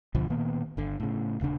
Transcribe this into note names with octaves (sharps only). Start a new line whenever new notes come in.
D2 B2 D3 F3
A#2 D#3 A#3 B3
G1 D3
A2 C#3
D#1 C#3 D4